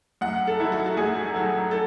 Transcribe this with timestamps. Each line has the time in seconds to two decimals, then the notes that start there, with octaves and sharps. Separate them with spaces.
0.21 F#2 F#5
0.47 A4
0.59 D#3 F#3 A3 E4
0.72 F#4
0.86 F#4
0.97 F#2 G#4
1.34 D#3 F#3 A3
1.71 A4